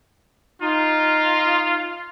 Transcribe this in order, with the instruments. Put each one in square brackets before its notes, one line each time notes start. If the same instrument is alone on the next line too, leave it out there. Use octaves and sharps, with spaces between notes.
[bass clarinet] D#4 [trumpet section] F4